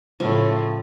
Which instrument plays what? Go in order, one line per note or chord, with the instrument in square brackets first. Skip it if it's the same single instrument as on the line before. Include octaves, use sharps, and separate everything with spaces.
[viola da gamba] A2 C#3 A3 [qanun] F3